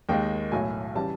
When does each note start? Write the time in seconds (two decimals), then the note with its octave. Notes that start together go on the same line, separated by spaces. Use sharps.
0.09 D#2 D#3 G#3 G5
0.52 B1 A2 F#3 G#5
0.95 C#3 E3 G3 A5